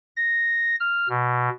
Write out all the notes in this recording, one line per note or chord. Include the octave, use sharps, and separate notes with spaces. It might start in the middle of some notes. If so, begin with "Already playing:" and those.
A#6
F6
B2